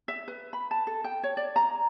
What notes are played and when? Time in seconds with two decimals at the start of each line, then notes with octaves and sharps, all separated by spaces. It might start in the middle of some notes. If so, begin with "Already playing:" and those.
0.08 E5
0.28 B4
0.53 B5
0.71 A5
0.87 A4
1.04 G5
1.23 C#5
1.37 D5
1.56 A#5